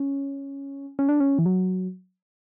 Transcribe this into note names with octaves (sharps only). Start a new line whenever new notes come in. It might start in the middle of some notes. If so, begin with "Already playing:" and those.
Already playing: C#4
C#4
D4
C#4
E3
F#3